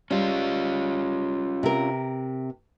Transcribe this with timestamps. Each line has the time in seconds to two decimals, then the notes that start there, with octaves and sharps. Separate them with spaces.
0.11 G3 C#4 F4
1.63 C3 A#4